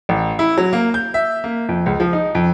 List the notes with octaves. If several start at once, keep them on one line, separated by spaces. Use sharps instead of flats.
A1
E4
F#3
A#3
G6
E5
A#3
F2
C#2
F3
D#4
F2